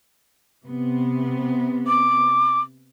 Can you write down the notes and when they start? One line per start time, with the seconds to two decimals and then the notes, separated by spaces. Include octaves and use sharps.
0.64 C3 B3
1.87 D6